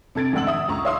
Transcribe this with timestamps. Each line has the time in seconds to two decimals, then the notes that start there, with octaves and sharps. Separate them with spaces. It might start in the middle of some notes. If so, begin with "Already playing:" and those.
0.15 C3 A4 G#6 A6 D7
0.33 A1 G#2 D3 F#5 E6 F#7
0.47 E5 D#6
0.68 C#2 A#5 C#6
0.85 C#5 E5 F5 C6 D#6 E6